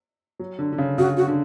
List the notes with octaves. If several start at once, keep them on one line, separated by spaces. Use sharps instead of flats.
F#3
D3
D3
C#3
C#3 F#4
F#4
D3